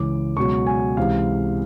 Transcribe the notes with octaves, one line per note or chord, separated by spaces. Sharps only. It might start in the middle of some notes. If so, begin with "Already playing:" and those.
Already playing: C#2 C#3 E3 D6
C#2 B2 F#3 C#6
G#5
C#2 C3 E3 F5